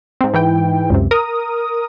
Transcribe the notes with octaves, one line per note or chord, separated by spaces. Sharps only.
G#2 C4
G#2 E3 E4 G5
C#2 F#2 C3
A#4 D#6